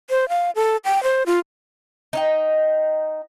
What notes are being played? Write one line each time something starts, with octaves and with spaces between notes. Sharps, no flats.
C5
F5
A4
G5
C5
F4
D#4 D#5 G5